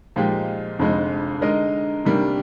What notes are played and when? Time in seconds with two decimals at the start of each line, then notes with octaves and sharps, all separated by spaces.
0.16 A#2 F3 G#3 D#4 G4
0.79 F1 F2 D3 G#3 D#4
1.41 D3 G#3 D#4 A#4 D#5
2.05 C3 D#3 G3 A#3 D4